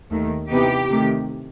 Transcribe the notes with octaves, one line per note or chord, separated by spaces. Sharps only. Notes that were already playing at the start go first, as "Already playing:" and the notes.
D#2 D#3 A3
C3 E3 B3 D#4 G4
C3 D#3 A3